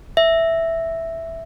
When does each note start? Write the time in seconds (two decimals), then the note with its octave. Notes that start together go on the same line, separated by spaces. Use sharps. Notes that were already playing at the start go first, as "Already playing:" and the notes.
0.17 E5